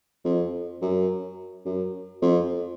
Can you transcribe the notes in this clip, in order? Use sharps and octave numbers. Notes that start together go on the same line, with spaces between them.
F2
F#2
F#2
F2